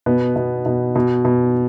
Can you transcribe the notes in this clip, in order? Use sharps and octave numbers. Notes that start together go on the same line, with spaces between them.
B2 B3
B2
B2
B2
B2